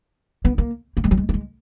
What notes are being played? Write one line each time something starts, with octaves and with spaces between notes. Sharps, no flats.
B3
A#3
A#3
G#3
F#3
G#3
A#3
G#3